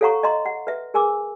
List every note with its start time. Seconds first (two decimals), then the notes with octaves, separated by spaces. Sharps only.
0.01 A4 C#5 F5 F#5 A#5 C#6
0.23 D#5 F5 A#5 C6
0.46 F#5
0.67 B4 E5
0.94 G#4 A#4 G#5 D6 E6